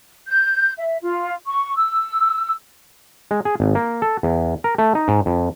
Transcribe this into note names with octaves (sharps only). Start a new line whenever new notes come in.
G6
E5
F4
C#6
E6
G#3
G#4
G#1
A#3
A4
E2
A#4
A3
D#4
G#2
F2